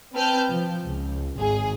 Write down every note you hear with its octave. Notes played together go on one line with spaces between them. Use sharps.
C4 B4 G5 A5 F6 G6
F3
C#2
G#1 G#4